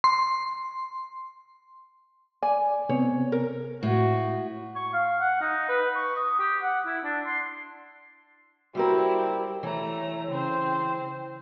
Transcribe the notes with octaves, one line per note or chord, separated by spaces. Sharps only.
C6
D5 G#5
C3 B3 C4 C#5
A#4
A2 F#4
C#6
F5
F#5
D#4
B4
C#6
D#6
G4
F#5
E4
D4
C6
G3 C4 E4 F#4 G4 A#4
E3 A3 C#5 A#5
C#3 C4 C5